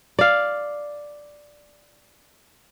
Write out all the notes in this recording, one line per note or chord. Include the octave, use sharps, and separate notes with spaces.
D5 F5